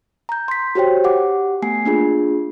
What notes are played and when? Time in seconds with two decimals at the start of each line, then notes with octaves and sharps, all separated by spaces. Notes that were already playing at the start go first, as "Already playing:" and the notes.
0.29 A#5 G6
0.48 C6 B6
0.75 F#4 G4 C5 C#5 G5
1.04 G4 F#5 D6
1.62 A3 B3 G#5 C7
1.85 A#3 D4 F4 G#4